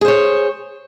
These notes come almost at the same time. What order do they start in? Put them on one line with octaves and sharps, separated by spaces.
G#4 C5 C#5